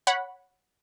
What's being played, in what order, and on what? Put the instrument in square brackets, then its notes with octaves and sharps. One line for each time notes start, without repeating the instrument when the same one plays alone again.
[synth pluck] C#5 F#5 B5